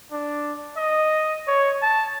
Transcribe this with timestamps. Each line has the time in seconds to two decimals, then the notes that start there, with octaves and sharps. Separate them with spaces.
0.12 D4
0.77 D#5
1.47 C#5
1.82 A5